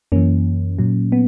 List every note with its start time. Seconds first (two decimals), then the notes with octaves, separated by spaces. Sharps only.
0.12 F#2 E3 A#3 C#4
0.79 A#2 F#3
1.12 B3